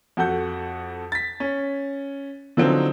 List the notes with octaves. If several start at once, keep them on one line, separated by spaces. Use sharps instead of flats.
F2 F#4 A4 F#5 G6
A6 B6
C#4
D3 F3 F#3 C4 D#4